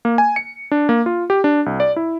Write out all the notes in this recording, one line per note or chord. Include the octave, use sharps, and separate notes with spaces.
A#3
G#5
C#7
D4
A#3
F4
G4
D4
C2
D5
E4